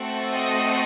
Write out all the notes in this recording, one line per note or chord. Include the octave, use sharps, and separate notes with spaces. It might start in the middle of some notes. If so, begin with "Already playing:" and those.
Already playing: A3 C4 F#4 A4
D#5